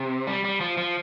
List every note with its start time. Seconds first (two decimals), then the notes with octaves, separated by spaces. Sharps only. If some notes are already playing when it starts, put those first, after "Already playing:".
Already playing: C3
0.27 G3
0.44 G3
0.61 F3
0.77 F3